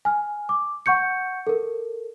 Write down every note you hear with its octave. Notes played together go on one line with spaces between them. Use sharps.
G#5 F6
D6
F#5 C#6 G6 C#7
A4 A#4